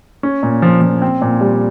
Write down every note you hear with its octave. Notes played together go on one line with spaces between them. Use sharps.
C#4
A#2
F3
F3
C4
A#2
G3